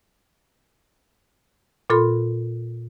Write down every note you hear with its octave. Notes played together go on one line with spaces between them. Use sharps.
A#2 F4 A4 B5 C6